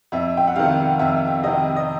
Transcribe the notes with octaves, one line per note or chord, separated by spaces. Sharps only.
F2 E5
G5
F#5
C3 D#3 F5
F2 E5
C3 D#3 D#5
D#5